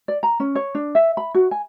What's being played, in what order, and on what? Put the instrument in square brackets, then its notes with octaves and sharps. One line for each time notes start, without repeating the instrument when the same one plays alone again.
[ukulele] D5
A#5
C#4
C#5
D4
E5
B5
F#4
G#5